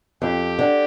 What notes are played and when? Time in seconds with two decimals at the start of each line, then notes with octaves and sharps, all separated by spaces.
0.22 F2 G4
0.59 D3